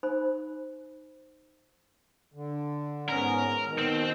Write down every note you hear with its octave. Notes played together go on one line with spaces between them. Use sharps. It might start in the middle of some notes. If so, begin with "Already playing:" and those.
D#4 C5 B5
D3
G#2 B3 C#4 A#4
B2 D#3
C4